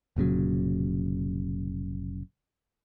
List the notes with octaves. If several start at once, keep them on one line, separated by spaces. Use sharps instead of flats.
F1 A#2 C#3 F#3